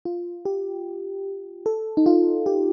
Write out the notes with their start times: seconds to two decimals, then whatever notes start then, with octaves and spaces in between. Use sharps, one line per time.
0.05 F4
0.45 G4
1.66 A4
1.97 D#4
2.06 F4
2.46 G4